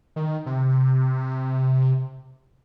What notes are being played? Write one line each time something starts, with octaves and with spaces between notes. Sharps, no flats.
D#3
C3